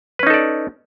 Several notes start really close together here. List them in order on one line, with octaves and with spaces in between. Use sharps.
B4 C#4 D#4 A4 D5